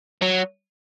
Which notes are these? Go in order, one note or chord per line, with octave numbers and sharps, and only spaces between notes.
F#3